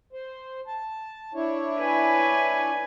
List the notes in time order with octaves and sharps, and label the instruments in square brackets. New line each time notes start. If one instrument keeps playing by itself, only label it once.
[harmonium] C5
A5
D4 E4 C#5
[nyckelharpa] B4 G#5